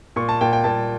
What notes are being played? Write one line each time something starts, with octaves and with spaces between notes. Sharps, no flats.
A#2 C#6
A5
A#2 G5
G5
A#2 A5